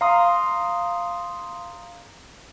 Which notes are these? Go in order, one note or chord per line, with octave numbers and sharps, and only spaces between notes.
F5 A#5 C6 D#6